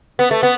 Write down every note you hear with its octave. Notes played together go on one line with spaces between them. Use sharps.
B3
A3
B3